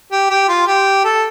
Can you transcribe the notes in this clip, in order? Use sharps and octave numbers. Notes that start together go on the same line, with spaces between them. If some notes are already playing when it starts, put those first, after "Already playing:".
G4
G4
F4
G4
A4